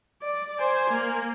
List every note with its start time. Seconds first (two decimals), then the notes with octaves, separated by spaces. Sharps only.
0.22 D5
0.59 C5 G#5
0.90 A#3